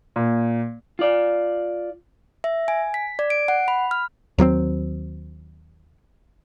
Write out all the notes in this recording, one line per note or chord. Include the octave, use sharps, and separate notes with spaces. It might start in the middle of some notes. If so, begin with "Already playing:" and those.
A#2
F4 D5
E5
G#5
B6
D5
D7
F#5
B5
F6
D#2 F#3 B3 C4